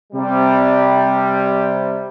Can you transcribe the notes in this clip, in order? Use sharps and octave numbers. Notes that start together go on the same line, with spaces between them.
C3 G3